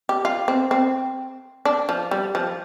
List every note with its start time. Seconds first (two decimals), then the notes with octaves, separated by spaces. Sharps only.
0.09 G4
0.25 F4
0.48 C4
0.71 C4
1.65 D4
1.89 F3
2.11 G3
2.35 F3